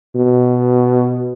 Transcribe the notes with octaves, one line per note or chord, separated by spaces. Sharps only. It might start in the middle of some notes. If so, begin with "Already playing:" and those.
B2